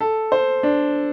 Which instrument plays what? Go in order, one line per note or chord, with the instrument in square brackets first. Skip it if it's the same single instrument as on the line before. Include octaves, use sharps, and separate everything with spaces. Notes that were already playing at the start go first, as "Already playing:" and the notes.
[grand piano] A4
C5
D4